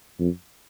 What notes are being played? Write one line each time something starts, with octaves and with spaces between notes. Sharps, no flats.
F2